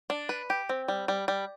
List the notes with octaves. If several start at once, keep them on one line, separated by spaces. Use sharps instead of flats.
D4
B4
G4
C4
G3
G3
G3